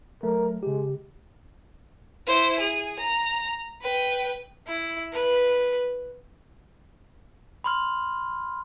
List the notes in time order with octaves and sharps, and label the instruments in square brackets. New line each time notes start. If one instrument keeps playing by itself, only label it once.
[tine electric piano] F#3 A3 [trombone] A#4
[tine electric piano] C#3 G4 [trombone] G#3
[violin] E4 C5
G#4
A#5
B4 G5
[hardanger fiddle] E4
B4
[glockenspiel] B5 C6 F6